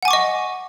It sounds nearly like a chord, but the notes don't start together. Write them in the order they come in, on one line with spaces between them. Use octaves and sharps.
F#5 G#5 D6 C#6 D#5